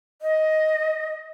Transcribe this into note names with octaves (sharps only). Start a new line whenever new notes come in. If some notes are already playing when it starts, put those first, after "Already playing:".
D#5